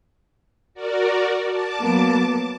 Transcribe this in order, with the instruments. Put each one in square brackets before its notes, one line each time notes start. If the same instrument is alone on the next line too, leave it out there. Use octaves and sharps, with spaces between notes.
[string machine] F#4 A#4 D5
A5 D6
[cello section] F#3 A#3 B3